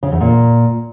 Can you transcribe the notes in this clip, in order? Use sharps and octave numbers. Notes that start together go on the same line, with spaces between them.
C#3
E2
A#2